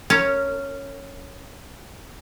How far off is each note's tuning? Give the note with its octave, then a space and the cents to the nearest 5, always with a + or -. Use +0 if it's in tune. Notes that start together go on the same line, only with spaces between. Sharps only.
C#4 +0 A#4 -25